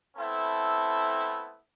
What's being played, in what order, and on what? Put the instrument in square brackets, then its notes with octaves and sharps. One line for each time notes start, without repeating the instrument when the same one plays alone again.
[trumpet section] A3 B3 C4 E4 A4